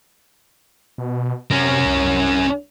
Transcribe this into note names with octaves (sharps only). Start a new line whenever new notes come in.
B2
C3 C#4 A#4
C2